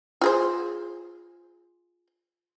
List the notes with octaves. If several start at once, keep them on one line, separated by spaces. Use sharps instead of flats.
F4 G#4 C5